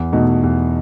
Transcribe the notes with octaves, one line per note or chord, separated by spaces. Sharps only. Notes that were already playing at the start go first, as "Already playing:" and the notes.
Already playing: E2
B2 A3 D#4
E2